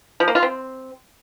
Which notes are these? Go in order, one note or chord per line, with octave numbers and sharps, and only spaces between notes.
F3
A#3
F4
C4